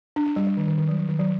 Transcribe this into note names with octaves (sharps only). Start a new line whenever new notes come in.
D4
D4
G3
G3
D#3
D#3
D#3
F#3
F#3
D#3
F#3